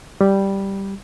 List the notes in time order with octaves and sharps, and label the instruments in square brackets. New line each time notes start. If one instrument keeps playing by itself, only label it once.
[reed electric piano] G3